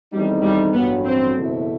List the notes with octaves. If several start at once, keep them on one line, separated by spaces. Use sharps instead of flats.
E2 D#3 G3 A3 C4 D#4
G3
A1 G2 F#3 B3
C4
F#1 E2 B2 A3 E4